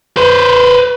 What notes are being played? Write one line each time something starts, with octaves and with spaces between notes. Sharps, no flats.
B4 C5